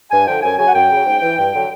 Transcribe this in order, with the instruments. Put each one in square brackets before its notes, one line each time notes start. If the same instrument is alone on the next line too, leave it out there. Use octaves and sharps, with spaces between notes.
[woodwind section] G2 G#5
D3 F3 G5
F#2 G#5
C#3 F#3 G#5
F#5
F#2 G5
C#3 F#3
G#2
E3
G2
D3 F#3